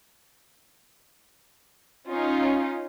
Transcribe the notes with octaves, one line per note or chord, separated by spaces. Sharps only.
C#4 D#4 F4